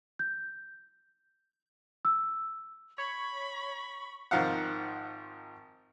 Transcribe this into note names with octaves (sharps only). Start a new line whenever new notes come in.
G6
E6
C#5 B5 C#6
G#1 D#3 F3 F5 F#5